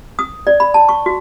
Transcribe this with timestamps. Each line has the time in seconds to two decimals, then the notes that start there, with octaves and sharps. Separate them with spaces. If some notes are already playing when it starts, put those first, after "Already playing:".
0.19 D#6
0.47 D5
0.60 B5
0.74 A5
0.89 C#6
1.06 F#4